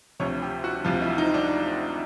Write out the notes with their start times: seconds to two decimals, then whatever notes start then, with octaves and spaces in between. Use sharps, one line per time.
0.20 D2 C3 F3 C#5
0.42 G4
0.64 F#4
0.84 D2 C3 F3 F4
1.01 E4
1.18 D#4
1.34 D4